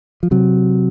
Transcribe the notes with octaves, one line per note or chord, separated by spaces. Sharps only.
F3
C3 F#3